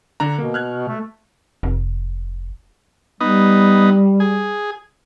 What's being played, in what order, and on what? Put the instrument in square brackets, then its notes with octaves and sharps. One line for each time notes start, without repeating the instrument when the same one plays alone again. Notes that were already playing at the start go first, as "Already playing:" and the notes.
[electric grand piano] D3 D4 A#5
[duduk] B2 [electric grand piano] A#3
[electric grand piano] F6 F#6 G#6
[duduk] A3
[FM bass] F1
[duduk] G3 [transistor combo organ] B3 D#4
[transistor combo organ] G#4